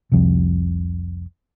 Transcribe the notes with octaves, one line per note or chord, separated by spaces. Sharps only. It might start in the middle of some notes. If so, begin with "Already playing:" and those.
F1 C2 F2